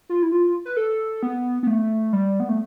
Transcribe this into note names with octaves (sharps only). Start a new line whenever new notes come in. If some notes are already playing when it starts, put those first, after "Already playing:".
F4
E4
F4
B4
A4
B3
B3
A3
G3
B3
A3